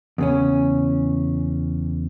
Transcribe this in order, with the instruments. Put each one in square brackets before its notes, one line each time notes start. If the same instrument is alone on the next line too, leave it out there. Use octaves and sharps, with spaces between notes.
[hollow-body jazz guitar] E2 C#3 C#4